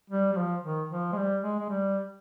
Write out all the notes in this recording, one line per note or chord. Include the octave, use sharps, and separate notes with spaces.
G3
G3
F3
D#3
F3
G#3
G3
G#3
G#3
G3